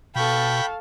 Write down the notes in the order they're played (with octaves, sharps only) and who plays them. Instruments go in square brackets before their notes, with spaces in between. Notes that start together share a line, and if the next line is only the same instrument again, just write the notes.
[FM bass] B2 [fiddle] A4 C#6 [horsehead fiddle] F5 A5 [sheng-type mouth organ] G5 B5